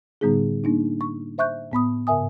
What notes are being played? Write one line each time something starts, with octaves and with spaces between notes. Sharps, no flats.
A2 D3 G3 B3 D#4 G#4
A#3 D4 D#4
C#6
C5 E5 C#6 F#6 G6
A2 B3 B5 D#6
G#2 C#3 A#4 E5 G#5 D#6